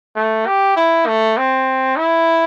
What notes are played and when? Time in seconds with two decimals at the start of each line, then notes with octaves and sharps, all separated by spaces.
0.16 A3
0.47 G4
0.76 E4
1.07 A3
1.37 C4
1.98 E4